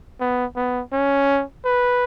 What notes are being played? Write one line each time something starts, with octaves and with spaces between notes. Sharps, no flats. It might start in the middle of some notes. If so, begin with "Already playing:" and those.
B3
B3
C#4
B4